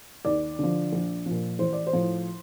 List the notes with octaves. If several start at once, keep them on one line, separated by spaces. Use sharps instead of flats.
D#2 D5
D3 F3
A#1
A#2 F3
A1 C5
D5
C5
A2 F3